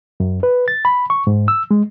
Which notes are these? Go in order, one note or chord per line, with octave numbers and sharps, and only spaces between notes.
F#2
B4
A6
B5
C#6
G#2
E6
G#3